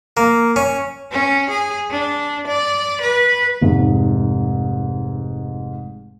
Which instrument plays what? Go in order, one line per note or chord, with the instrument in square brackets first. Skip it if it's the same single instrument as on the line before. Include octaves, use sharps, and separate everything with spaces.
[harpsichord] A#3
C#4
[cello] C#4
G#4
D4
D5
B4
[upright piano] F1 G#2